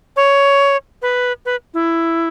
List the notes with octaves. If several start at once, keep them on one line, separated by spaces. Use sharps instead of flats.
C#5
B4
B4
E4